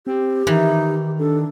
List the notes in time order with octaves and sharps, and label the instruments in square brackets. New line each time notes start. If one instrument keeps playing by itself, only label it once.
[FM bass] C4 [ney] G4
[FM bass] D#3 [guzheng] E3 [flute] D#4
[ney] D4 [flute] A4